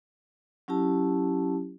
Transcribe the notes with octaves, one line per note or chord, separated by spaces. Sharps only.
F#3 C#4 E4 G4 A5